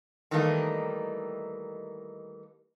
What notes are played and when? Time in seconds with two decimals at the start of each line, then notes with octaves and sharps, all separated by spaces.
0.31 D#3 E3 G3 A3 A#3 D#4